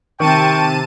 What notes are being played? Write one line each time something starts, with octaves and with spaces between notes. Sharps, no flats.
C3 D#3 G5 A5 C#6 D#7